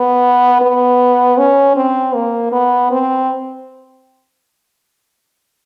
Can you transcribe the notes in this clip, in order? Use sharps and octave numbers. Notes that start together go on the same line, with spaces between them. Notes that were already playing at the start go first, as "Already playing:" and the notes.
Already playing: B3
B3
C#4
C4
A#3
B3
C4